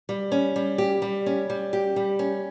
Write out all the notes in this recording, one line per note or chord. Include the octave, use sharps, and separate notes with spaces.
G3
C#4
G3
G4
G3
C#4
G3
G4
G3
C#4